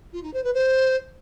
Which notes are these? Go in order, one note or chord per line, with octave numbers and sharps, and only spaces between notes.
F4
D#4
C5
B4
C5